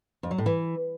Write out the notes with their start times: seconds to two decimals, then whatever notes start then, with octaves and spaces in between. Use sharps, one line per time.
0.23 F2
0.31 F#3
0.38 A2
0.46 E3